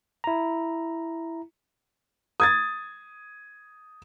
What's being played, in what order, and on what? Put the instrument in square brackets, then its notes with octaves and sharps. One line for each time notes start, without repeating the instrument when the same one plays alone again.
[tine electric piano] E4 A#5
[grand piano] D#6 G#6 A6